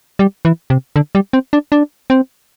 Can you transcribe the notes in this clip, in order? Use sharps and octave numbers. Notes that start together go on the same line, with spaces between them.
G3
E3
C3
D3
G3
C4
D4
D4
C4